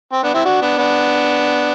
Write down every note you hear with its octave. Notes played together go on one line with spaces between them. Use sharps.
C4
B3 D4
C4 E4
D4 F#4
B3 D4
B3 D4